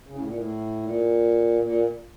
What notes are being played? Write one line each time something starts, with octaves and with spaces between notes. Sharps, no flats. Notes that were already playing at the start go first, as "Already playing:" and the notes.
C#3
A2
A#2
A2
A#2
A#2